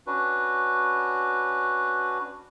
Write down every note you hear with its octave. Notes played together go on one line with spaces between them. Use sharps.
C#4 D4 F#4 B4